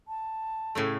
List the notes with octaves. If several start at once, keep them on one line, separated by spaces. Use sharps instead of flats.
A5
A2 C#3 A3